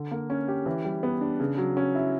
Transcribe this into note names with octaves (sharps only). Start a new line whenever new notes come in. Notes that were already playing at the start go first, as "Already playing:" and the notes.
Already playing: D3
A#3
C#4
G4
E3
G3
B3
D4
C#3
F#3
C#4
E4